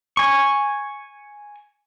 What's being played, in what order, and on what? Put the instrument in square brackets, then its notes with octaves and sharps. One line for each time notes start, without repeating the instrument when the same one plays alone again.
[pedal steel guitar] G#5 C#6